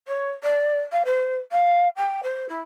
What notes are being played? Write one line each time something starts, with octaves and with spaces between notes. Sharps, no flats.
C#5
D5
F5
C5
F5
G5
C5
E4